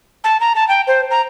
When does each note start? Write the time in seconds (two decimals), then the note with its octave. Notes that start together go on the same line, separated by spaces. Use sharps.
0.24 A5
0.40 A#5
0.55 A5
0.69 G5
0.87 C5
1.11 A#5